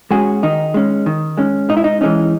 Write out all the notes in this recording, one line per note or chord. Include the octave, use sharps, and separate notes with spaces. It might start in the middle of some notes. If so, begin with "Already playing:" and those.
G#3 C#4 F#4 G#4
D#3 D#4
G#3 C#4
D#3
G#3 C#4
G#2 D#4
E4
D#4
E3 G#3 C#4 D#4